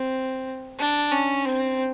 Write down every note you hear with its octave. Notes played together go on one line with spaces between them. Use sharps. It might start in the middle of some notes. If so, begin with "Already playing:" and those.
Already playing: C4
D4
C#4
C4